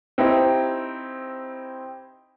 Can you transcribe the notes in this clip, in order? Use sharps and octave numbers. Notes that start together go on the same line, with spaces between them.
C4 D#4 E4 G4